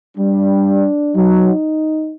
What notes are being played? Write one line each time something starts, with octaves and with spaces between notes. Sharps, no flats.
G3 D4
F#3 D#4